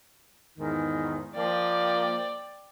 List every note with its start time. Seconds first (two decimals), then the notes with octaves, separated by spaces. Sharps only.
0.58 E2 G#2 D#3
1.36 F3 A#3 D5 G5